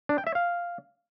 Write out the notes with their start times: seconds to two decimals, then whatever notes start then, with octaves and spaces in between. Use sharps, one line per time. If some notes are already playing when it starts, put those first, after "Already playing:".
0.09 D4
0.18 G5
0.27 E5
0.35 F5